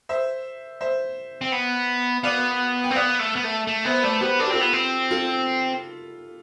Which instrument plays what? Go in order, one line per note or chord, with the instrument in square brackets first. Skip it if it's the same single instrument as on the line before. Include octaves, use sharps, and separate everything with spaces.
[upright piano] C5 E5
C5 E5
[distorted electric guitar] C4
B3
[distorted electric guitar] B3 [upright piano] D5 F5
[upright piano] G5
[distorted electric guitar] C4
[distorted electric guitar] B3 [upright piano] D5 F5
[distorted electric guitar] A3
B3
A3
A3
[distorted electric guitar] B3 [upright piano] C5 E5
[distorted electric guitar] A3 [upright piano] B4 D5
[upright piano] C5
[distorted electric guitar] B3 [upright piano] G4 B4
[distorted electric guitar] D4 [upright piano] A4
[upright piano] G4
[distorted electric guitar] C4 [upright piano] F4 A4
[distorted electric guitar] B3
C4
[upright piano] F4 A4